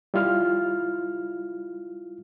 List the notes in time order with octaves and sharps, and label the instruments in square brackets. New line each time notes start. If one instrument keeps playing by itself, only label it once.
[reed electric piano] G3 E4 F4 F6